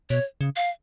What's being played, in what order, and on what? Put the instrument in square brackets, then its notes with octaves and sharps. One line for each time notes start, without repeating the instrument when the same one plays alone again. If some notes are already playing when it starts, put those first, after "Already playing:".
[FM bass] B2 [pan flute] C#5
[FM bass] C#3
[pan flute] F5